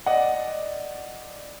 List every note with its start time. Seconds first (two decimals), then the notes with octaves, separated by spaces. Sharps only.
0.06 D5 D#5 F#5